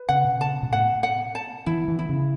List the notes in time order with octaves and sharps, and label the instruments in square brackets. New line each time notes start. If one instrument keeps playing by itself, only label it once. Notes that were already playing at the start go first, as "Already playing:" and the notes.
Already playing: [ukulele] B4
[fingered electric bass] C#3 [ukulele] F#5
[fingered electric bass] B2
[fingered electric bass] C#3 [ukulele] A5
[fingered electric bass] B2
[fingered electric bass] A2 [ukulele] F#5
[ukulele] F#5
A5
[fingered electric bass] E3 [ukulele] E4
[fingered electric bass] E3
[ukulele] E4
[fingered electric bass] C#3